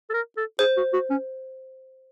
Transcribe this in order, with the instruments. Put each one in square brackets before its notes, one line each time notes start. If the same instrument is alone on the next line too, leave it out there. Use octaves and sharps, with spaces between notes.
[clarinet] A4
A#4
A4
[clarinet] G#4 [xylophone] C5
[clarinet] F#4
F#4
C#4